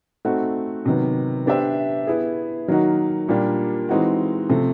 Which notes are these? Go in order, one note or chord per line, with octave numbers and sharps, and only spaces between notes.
A3 C4 D#4 F#4
C3 D#3 F#3 B3
B3 D4 G4 C5 E5
B3 E4 G#4
D#3 F#3 A#3 D#4 F#4
A#2 G3 A#3 D4 G4
E3 G#3 C4 D#4 F#4
C3 F3 A3 C4